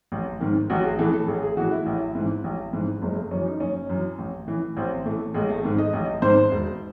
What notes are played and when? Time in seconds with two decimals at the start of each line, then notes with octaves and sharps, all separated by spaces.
0.12 A1
0.41 G#2 D#3
0.70 A1 F#4
0.84 G#4
0.99 A2 E3 A4
1.13 A4
1.28 A1 G#4
1.43 G#4
1.57 A2 E3 F#4
1.71 E4
1.86 A1
2.15 G#2 E3
2.44 A1
2.73 G#2 E3
3.02 F#1 G#3
3.16 A3
3.31 F#2 E3 C#4
3.46 D#4
3.60 F#1 C#4
3.89 F#2 E3
4.19 A1
4.47 A2 E3
4.77 A1 C4
5.05 A2 E3 A3
5.34 A1 G#3
5.49 A3
5.64 G#2 D#3
5.78 D#5
5.93 A1 D#5
6.22 G#2 D#3 C5
6.51 E1